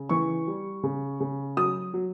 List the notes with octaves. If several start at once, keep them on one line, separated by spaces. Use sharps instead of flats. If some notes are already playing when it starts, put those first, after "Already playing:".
Already playing: C#3
E3 C#6
G3
C#3
C#3
F#3 D#6
F#3